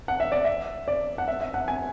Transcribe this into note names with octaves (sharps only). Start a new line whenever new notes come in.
F#5
E5
D5
E5
D5
F#5
E5
E5
F#5
G#5